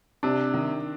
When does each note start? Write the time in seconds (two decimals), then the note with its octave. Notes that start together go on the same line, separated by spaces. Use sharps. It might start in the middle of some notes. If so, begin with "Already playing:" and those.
0.23 C3 D4
0.54 D#3